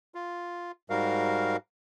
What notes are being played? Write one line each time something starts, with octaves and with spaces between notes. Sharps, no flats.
F4
G#2 G3 F#4 A#4 F5